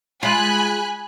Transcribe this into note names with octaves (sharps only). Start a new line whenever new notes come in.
G#3 F4 G#5 B5 F#6